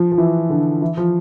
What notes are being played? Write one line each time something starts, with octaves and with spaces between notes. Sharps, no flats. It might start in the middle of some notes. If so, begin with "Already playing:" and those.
Already playing: F3
F3
E3
D3
E3
F3